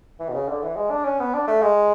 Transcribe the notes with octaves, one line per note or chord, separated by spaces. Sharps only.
E3
B2
C#3
D3
E3
G#3
D4
C#4
B3
D4
A3
G#3